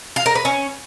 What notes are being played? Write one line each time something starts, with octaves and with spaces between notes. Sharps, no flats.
F5
A#4
B4
C#4